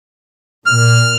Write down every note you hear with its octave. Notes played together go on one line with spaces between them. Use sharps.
A#2 F6